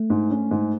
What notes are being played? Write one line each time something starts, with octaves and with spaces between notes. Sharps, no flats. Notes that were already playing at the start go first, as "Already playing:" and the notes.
Already playing: A3
G#2
C#4
G#2